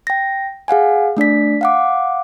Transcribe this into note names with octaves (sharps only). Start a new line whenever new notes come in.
G5 A#6
G#4 F5 F#5 G#5
A3 D4 D5 B6
F5 F#5 D6